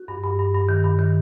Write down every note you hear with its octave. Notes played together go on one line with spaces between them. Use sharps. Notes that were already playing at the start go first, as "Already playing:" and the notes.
Already playing: F#4
G2
G2
G2
G2
D#3
G2
D#3